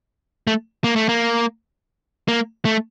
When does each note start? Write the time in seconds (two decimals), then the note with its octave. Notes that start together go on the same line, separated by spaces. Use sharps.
0.47 A3
0.84 A#3
0.96 A3
1.09 A#3
2.28 A#3
2.65 A3